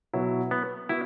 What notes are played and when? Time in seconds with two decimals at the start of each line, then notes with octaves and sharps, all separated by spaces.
0.13 B2 F#3 E4
0.51 B3
0.89 B3 E4 F#4